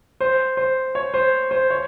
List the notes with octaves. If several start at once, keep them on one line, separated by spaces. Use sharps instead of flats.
C5
C5
C#5
C5
C5
C#5